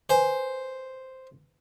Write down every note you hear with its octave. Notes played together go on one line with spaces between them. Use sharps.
B4 C5 G#5